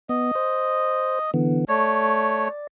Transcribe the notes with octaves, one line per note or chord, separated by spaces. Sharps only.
B3 D#5
C5
D3 E3 B3
A3 C#5 D5